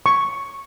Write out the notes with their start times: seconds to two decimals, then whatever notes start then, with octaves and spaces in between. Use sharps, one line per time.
0.06 C#6